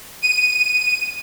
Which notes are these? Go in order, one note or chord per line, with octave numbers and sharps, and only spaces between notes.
D#7